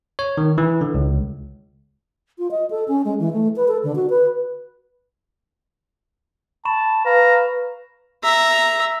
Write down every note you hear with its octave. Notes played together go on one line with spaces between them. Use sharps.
C#5
D#3
E3
D3
C#2
F4
D#5
A4
C#4
G#3
E3
A3
B4
A4
D3
F#4
B4
A5 B5 C#6 E7
B4 F5 A#5
E5 A#5